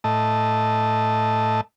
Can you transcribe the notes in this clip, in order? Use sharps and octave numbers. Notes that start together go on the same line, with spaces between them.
A2 A3 D#5 A5